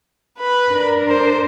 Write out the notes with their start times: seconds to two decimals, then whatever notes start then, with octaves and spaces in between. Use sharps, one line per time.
0.39 B4 B5
0.70 D4 A#4
1.08 C5